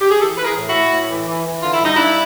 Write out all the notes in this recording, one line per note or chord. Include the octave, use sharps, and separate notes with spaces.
G4
G#4
E3 G4 A4
E3 B4
G#4 A#4
A2
E4 F#4
A2
A2
E3
E3
E3
D3 F4
E4
G2 D#4
G2 D4 E4